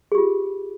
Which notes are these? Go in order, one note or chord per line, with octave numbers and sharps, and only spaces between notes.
F4 G4 G#4